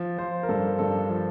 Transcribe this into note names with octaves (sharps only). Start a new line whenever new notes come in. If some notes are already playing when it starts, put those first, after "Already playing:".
Already playing: F3
F3 C5
A#4
G2 A4
G2 A4
F3